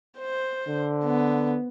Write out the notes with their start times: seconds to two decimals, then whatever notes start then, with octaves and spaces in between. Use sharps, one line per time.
0.18 C5
0.68 D3
1.05 B3